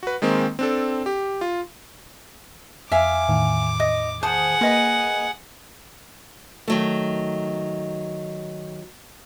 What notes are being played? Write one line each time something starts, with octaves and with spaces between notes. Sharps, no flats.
F#4 B4
D#3 G#3 A#3 C4
C4 D4 A4
G4
F4
F2 E5 F5 G#5 D6
E2 A2 D#3
D#5
G#4 C5 F#5 A5 D#6
A#3 B4 D#5 B5
D#3 F#3 A3